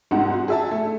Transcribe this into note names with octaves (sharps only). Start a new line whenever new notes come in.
C2 G#2 F#5
F#4
G#4 E5 A5
A3